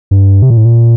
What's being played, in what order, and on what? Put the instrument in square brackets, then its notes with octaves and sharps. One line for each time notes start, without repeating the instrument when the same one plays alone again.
[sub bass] G2
C3
A#2
A2
A#2